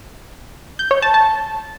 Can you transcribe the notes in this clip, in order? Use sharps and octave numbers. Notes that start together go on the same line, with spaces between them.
G6
C#5
A5
A5